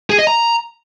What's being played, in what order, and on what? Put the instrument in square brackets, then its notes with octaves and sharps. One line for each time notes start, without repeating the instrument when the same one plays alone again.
[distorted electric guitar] G#4
D#5
A#5